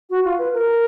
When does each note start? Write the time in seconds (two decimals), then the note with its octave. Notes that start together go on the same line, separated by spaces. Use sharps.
0.10 F#4
0.24 F4
0.38 B4
0.53 A#4